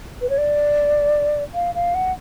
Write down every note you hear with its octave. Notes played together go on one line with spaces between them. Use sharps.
B4
C#5
D5
F5
F5
F#5